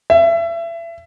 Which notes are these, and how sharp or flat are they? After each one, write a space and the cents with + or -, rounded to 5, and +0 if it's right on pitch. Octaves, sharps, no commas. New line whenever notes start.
E5 +30